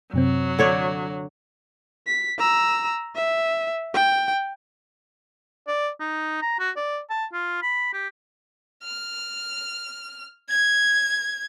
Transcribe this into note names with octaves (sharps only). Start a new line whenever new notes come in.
F#2 C3 F#3 C4
D3 C#5 D5
B6
A#5 E6
E5
G5
D5
D#4
A#5
F#4
D5
A5
F4
B5
G4
F6
G#6